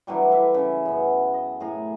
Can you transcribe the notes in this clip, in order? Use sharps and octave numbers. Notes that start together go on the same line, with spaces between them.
D3 E3 F#3 G3
E4 B4 E5 D6
C#3
F#2 B3
D#5
A2 G#4 A#4 G#5